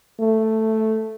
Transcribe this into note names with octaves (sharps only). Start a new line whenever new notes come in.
A3